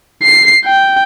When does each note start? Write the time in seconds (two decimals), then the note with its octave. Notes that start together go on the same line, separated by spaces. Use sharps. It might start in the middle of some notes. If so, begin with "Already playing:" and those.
0.23 C7
0.65 G5